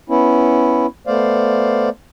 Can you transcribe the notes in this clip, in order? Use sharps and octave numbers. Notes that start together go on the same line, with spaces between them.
B3 C#4 E4
A3 B3 C5 D5 F5